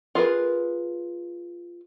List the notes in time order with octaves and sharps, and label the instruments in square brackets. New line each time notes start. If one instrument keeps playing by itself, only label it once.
[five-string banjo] F4 G#4 A#4 B4